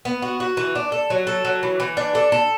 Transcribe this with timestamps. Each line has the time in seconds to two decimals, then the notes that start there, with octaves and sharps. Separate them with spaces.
0.05 B3
0.22 F#4
0.40 F#4
0.57 E3
0.75 D4
0.92 A4
1.10 F#3
1.27 A4
1.45 F#3
1.63 E3
1.80 E3
1.97 D4
2.15 A4
2.32 A4